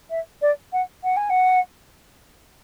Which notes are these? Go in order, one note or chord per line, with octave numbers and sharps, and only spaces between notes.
E5
D5
F#5
F#5
G#5
F#5